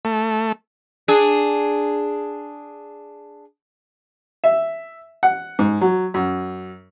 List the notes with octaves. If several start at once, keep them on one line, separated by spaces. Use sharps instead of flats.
A3
D4 G#4
E5
F#5
G#2
F#3
F#2